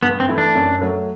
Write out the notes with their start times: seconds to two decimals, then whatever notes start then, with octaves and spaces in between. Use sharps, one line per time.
0.03 G2 B3
0.20 C4
0.29 E3 A3 E4
0.38 D4
0.55 F#2
0.82 F#3 A3